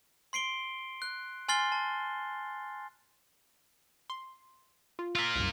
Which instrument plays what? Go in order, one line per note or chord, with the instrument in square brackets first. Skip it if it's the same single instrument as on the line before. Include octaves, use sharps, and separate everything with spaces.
[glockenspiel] C6 C7 D7 G7
F#6
G#5 C6 F6 A6 C7 G7
A5
[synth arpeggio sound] C6
F4
[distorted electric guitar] F4 A#4 [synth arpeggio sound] C6 E6 B6
[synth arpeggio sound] C2 F#2